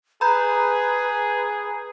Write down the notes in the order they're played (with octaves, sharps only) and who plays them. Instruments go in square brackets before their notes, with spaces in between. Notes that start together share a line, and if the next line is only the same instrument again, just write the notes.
[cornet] G#4 [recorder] B4 [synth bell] A#5 B5 G6